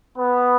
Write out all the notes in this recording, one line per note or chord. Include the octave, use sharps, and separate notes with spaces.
B3 B4